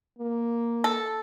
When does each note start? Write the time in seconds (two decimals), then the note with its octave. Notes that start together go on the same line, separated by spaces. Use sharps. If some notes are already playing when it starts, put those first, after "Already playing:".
0.19 A#3
0.84 A4